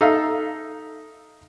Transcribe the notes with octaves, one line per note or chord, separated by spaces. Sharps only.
D#4 A4 E5 F5 A#5